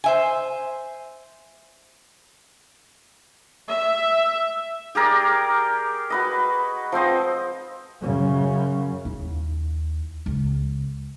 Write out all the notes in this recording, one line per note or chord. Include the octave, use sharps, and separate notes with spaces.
C5 E5 G#5
E5
G4 G#4 A#4 D5
F#4 B4 D#5
F3 C4 C5 D#5
F#2 C#3
D#2 E4
C#2